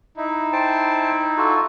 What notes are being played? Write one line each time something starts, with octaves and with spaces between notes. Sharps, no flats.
D#4 E4
C5 G5 A5
F4 F#4 A4